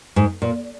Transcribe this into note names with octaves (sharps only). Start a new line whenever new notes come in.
G#2
A#2